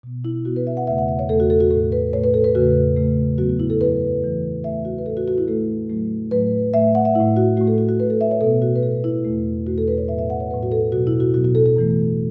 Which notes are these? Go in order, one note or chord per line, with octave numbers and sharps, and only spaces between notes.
B2 B3
E4
B2 B3 F#4
B4
E5
F#5
E2 C#3 A3 E5
F#5
E5
C#5
E2 C#3 A3 A4
F#4
A4
F#4
A2 A3 A4
B4
A2 A3 C#5
B4
A4
B4
E2 C#3 A3 F#4
E2 C#3 A3
F#2 F#3 B3 F#4
F#4
E4
A4
F#2 F#3 B3 B4
F#2 E3 A3
F#2 E3 A3 E5
F#4
B4
A2 A3 A4
F#4
F#4
E4
A2 A3 A4
A2 F#3 A3
A2 F#3 A3 B4
A2 A3 E5
F#5
E5
A2 A3 E4
F#4
A2 A3 F#4
A4
F#4
F#4
A2 A3 B4
A4
E5
C#5
B2 B3 A4
F#4
B4
B2 B3 A4
E4
E2 B2 A3
E2 B2 A3 F#4
A4
B4
C#5
A2 F#3 B3 E5
E5
F#5
C#5
A2 F#3 B3 B4
F#4
A4
B2 F#3 B3 F#4
E4
F#4
B2 F#3 B3 F#4
F#4
A4
A4
F#2 E3 A3